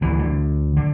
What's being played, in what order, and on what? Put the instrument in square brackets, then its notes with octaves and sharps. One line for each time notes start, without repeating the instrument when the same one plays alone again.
[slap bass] D2 D3 E3
D3
D3